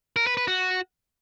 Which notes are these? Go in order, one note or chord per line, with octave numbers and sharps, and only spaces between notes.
A#4
B4
B4
F#4